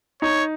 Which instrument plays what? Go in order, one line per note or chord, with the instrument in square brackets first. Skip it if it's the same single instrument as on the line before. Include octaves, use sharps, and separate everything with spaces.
[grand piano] D#4 [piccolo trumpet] C#5